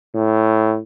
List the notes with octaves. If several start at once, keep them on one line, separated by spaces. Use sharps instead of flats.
A2